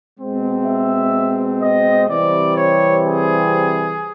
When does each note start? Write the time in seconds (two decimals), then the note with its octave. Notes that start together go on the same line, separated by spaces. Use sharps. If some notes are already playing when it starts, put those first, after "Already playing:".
0.19 B2 G#3 C4
0.66 E5
1.61 D#5
2.09 C3 E3 G3 C4 D5
2.57 C#5
3.05 G#4